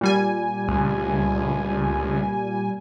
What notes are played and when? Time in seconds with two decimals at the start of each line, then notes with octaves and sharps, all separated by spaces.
0.01 A#2 G3 G#5
0.68 C#2